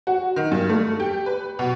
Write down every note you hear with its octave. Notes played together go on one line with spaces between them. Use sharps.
F#4
D#3
G2
A3
G4
B4
B2